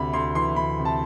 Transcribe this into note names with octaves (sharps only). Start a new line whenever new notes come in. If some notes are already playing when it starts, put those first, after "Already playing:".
Already playing: D2 C3 B5
D2 C6
E3 C6
D2 B5
C3
A5